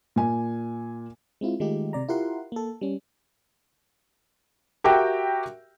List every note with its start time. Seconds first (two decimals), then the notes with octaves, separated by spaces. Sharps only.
0.16 A#2 G#5
1.41 G#3 C4 E4 F4
1.60 D#3 G#3 A3 D#4 F4 G4
1.93 C3 D5 A#5
2.08 E4 F4 G4 A#4 F#5 C6
2.52 A#3 A4
2.81 G3 C#4
4.84 F#4 G4 A#4 E5 G5